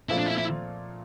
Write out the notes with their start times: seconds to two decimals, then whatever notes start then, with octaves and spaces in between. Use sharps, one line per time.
0.09 A#2 F3 A3 C4 E4 F4
0.18 D4
0.26 E4
0.38 E4